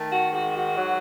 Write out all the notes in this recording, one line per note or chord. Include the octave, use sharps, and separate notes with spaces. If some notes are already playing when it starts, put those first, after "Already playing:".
Already playing: D#3 A3
F#4
G#2 F#4
F#4
F#3